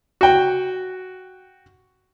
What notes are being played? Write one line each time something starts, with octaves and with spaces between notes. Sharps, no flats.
F#4 G5